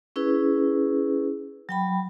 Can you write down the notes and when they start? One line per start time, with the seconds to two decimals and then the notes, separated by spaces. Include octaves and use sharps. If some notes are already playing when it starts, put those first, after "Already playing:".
0.16 C#4 E4 G#4 B4
1.69 F#3 G5 B5